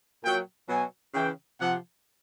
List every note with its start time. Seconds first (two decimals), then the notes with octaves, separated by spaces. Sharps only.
0.23 A#2 F#3 G5
0.68 B2 F#3 G#5
1.14 C#3 E3 G5
1.59 C3 F3 F#5